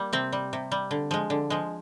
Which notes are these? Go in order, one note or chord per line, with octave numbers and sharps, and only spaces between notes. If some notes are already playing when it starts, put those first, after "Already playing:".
Already playing: G3 A#3
C3 C4
G3
C3
G3
D3
F3 G#3
D3
F3 G#3